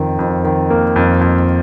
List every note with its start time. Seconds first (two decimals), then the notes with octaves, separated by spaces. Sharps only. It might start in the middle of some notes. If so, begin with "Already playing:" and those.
Already playing: F2 D#3
0.19 F2
0.44 D#3
0.70 A#3
0.96 F2
1.21 F2